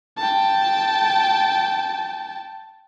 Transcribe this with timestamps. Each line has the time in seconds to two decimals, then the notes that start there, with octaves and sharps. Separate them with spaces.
0.18 G5 A5